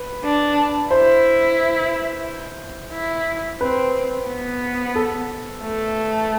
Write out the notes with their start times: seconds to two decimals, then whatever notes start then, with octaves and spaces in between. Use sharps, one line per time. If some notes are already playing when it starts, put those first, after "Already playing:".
Already playing: B4
0.24 D4
0.91 E4 C5
2.93 E4
3.61 C4 B4
4.27 B3
4.96 A4
5.62 A3